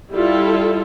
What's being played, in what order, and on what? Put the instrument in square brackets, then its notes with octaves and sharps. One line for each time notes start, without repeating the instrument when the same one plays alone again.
[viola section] G3 E4 F4 A4